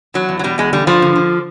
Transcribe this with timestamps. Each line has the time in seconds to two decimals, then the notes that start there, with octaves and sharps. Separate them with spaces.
0.14 E2 F#3
0.29 E2
0.39 F#3
0.44 B2 G3
0.58 E2 G#3
0.73 D3 G3
0.87 G2 F3
1.02 D3
1.16 D3